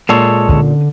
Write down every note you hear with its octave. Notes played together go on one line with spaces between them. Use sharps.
A#2 G#3 A4 C#5
D3 C#4 D#4